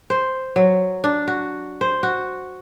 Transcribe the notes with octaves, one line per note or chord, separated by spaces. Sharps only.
C5
F#3
D4
F#4
C5
F#4